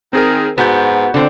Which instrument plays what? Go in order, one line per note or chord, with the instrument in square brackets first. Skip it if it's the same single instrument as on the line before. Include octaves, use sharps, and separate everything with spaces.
[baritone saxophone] D#3 [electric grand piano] C4 G#4 A#4
[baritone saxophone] G#2 [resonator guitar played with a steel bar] B3 [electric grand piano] F#4 G6
[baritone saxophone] F2 [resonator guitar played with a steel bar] D3 C4